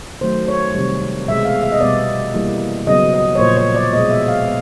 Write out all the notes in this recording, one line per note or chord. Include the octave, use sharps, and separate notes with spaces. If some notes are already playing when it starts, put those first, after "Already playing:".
D#3 F#3 A3 C5
C#5
C3 D#3 G3
B2 G#3 B3 E5
F5
E5
D#5
B2 G3 B3 D5
E3 G3 A#3
C#3 F#3 B3 D#5
D#5
C#5
A#2 F3 A#3 C5
C#5
D5
B2 G#3 B3 D#5
E5
F5
G#3 B3